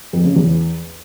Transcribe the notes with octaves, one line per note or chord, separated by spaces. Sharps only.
F2
C#3
E2